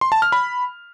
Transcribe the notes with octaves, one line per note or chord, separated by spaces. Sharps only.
C6
A5
F6
B5